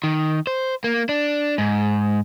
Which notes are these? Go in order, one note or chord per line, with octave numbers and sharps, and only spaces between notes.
D#3
C5
A#3
D4
G#2